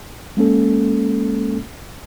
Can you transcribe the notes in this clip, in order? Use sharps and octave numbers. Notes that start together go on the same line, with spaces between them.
G#3 A#3 C#4 A4